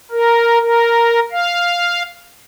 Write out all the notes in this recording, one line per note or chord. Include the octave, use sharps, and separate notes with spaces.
A#4
A#4
F5